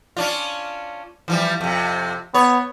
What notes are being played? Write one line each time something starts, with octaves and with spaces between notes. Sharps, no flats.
C#4 D4 F4
E3 F3 G3
F2 C3
B3 C#5